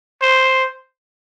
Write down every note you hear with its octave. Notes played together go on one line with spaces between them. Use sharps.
C5